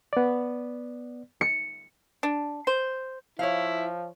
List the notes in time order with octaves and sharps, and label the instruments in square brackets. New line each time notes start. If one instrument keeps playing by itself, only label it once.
[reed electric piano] B3 D5
[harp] C#7
[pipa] D4
C5
[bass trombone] F3 [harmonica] E4 [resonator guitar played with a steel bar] C#5 F5